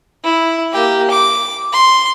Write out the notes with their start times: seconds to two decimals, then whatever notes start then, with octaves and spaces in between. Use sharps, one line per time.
0.24 E4
0.73 A#3 G4
1.11 D6
1.73 C6